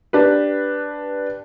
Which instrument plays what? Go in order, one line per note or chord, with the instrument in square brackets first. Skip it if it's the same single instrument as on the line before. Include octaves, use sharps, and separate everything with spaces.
[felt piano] D4 G4 B4